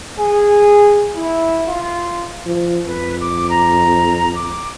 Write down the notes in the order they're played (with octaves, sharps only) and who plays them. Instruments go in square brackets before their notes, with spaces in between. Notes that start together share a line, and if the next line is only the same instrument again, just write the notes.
[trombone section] G#4
E4
F4
[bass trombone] F3
[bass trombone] F2 [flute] B4
[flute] D6
A#5
D6